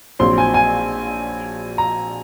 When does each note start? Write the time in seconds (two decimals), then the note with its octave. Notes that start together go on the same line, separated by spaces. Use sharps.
0.19 A#1 A#2 F#3 C4 C6
0.38 G#5
0.54 G#5
1.78 A#5